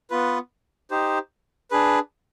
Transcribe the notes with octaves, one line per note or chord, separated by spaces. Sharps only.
B3 F4 B4
D#4 G4 C5
D4 G#4 B4